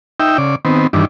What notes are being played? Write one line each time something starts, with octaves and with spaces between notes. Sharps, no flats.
D#4 E5 G5
C#3 D5
D#3 B3 C4
G2 D#3 E3 D4